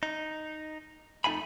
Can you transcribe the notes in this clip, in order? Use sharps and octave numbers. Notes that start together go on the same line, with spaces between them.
D#4
F2 A3 D#4 F5 G#5 B5